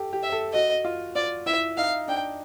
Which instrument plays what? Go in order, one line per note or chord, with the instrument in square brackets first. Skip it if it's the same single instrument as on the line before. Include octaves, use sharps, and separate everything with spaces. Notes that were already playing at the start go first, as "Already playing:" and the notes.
Already playing: [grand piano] G4 A4
G4
[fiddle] E5
[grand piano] A4
[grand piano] F#4 [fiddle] D#5
[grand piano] F4
[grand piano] F4 [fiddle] D5
[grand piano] E4 [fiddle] E5
[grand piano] D#4 [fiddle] F5
[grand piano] D4 [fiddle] G5